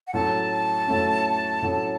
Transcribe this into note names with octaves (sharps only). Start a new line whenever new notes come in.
F#5
A2 F#3 A3 C#4 A5
A2 F#3 A3 C#4
A2 F#3 A3 C#4